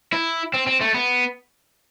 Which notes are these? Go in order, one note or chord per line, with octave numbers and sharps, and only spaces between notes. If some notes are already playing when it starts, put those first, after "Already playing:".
E4
C4
C4
A3
B3